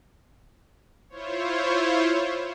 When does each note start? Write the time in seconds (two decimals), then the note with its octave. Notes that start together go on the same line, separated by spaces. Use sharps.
1.09 E4 F4 C5 C#5